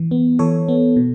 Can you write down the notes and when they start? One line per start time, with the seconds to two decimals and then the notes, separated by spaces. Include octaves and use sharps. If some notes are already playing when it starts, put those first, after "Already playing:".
Already playing: E3
0.11 B3
0.39 E3 A4 C#5
0.68 B3
0.96 B2